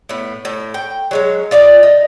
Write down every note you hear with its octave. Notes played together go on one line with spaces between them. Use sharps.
A2 B3
A2
G5
F#3 G#3 C#4
F4 D5 D#5 F5
D#4